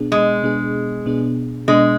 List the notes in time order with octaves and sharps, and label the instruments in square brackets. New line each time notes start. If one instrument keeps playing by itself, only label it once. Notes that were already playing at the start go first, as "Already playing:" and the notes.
Already playing: [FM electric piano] B2 B3 D4 G#4
[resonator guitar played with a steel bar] G#3
[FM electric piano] B2 B3 D4 G#4
B2 B3 D4 G#4
[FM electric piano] B2 B3 D4 G#4 [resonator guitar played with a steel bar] G#3